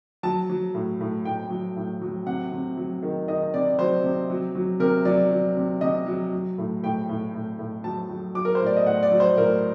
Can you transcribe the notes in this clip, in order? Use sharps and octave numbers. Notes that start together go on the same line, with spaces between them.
F#3 A5
F#3
A2
A2
A2 G5
F#3
A2
F#3
C3 F#5
C3
F#3
D#3
D#3 D#5
C3 D5
F#3 C5
C3
F#3
F#3
C3 A#4
F#3 D5
F#3
C3
C3 D#5
F#3
F#3
A2
A2 G5
A2
A2
A2
F#3 A5
F#3
F#3 D6
A#4
C5
A2
D5
D#5
A2 F#5
D5
F#3
C5
A2 A#4